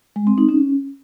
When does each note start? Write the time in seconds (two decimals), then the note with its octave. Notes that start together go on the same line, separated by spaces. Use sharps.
0.16 G#3
0.27 C4
0.38 D#4
0.49 C#4